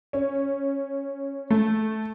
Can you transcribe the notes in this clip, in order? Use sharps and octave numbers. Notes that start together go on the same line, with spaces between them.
C#4
A3